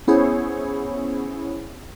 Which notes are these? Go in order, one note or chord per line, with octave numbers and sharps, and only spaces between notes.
B3 C#4 E4 G#4 C5 C#5